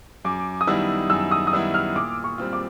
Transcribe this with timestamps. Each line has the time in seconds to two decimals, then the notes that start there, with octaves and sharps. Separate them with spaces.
0.25 F#2 D6
0.61 D#6
0.67 D#3 G3 B3 E4 E6
1.10 F#2 E6
1.31 D#6
1.47 D#6
1.53 D#3 G3 B3 E4 E6
1.74 F6
1.96 A#2 D6
2.24 C#6
2.38 G3 C4 F4
2.53 D6